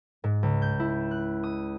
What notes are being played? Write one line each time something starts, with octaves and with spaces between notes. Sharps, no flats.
G#2
C#2
G6
E4
F#6
D#6